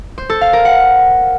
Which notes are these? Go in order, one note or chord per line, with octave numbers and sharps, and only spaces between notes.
C5
A4
F5
A#4
F#5